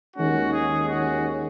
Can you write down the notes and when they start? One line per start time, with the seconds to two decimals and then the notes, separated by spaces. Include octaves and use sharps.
0.16 D#2 D#3 G#3 C#4 F#4
0.53 G#4
0.89 F#4